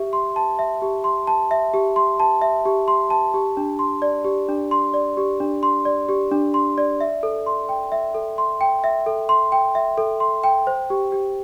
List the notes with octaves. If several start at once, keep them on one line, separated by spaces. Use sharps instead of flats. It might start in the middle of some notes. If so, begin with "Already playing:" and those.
Already playing: G4 E5
C6
A5
E5
G4
C6
A5
E5
G4
C6
A5
E5
G4
C6
A5
G4
D4
C6
D5
G4
D4
C6
D5
G4
D4
C6
D5
G4
D4
C6
D5
E5
A4
C6
G5
E5
A4
C6
G5
E5
A4
C6
G5
E5
A4
C6
G5
C5
G4
G4